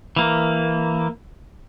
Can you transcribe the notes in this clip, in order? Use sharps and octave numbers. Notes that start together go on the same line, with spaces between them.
E3 A#3